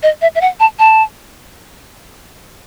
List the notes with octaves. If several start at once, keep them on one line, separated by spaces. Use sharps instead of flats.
D#5
E5
E5
F#5
A5
A5